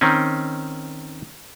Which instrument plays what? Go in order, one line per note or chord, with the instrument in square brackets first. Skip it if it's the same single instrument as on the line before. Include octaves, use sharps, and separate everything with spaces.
[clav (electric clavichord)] D#3 C4 C#4